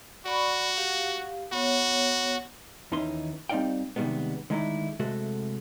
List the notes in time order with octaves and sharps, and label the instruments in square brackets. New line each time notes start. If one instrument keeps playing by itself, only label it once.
[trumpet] F#4 [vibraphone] D5 B5 C#6
[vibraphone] G4 F5
[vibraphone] B3 C#5 [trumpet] F#4
[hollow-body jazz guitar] D#2 D#3 E3 C#4 D#4 C6
G3 C4 D#4 D5 F5 G5
C3 D#3 F3 G3 G#3 B3
D3 D#3 G#3 A3 D#4 E4
C3 G#3 A3 F#4 A4